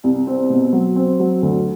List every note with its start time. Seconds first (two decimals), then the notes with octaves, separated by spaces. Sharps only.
0.04 C2
0.27 C4
0.50 B2
0.73 F#3
0.96 C4
1.20 F#3
1.42 D2